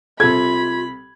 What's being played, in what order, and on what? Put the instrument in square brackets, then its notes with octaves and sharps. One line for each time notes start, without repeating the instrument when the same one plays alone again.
[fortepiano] C2 A4 [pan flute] F4 [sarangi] B5 [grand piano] G#6